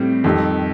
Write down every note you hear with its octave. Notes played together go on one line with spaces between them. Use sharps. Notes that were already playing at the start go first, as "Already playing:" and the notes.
Already playing: A2 G3 C4
F2 D#3 G3